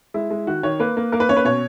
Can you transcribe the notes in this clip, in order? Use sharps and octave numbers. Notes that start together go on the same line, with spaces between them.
G#3 E4
G#3
D#3 F#4
D#3 C#5
A#3 B4
A#3
A#3 A#4
B4
C#4 C#5
B4
B2 C#5